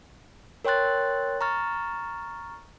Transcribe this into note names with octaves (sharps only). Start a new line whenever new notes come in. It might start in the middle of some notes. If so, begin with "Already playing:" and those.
A#4 C#5 G5 C6 F#6 A6
A#5 C#6 F6 A6